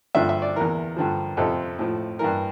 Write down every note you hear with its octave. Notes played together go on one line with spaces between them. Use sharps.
G2 D3 F3 E5
E5
D5
E2 E3 A#4
G2 D3 F3
F2 C3 F3 A4
A2 F3
G2 E3 A#4